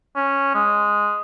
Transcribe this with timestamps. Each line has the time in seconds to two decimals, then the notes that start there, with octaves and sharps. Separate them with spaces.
0.16 C#4
0.55 G#3